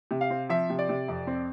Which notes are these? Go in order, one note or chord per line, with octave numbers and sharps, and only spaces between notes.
C3
F5
C4
F3 E5
C3
D5
C3
F2
C4